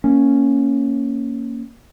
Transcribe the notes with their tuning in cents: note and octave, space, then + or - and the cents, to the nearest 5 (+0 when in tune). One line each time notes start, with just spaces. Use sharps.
A#3 +0 C#4 +0